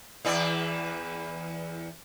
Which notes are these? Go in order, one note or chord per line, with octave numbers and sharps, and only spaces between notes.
E2 E3 D5